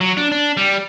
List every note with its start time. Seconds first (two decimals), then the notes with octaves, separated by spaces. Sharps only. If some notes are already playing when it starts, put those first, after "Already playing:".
0.01 F#3
0.17 D4
0.32 D4
0.57 G3